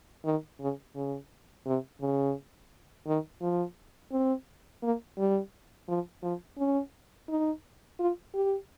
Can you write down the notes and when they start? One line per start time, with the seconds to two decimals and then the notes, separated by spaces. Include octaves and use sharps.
0.25 D#3
0.60 C#3
0.95 C#3
1.66 C3
2.01 C#3
3.07 D#3
3.42 F3
4.12 C4
4.83 A#3
5.18 G3
5.88 F3
6.23 F3
6.58 C#4
7.29 D#4
7.99 F4
8.34 G4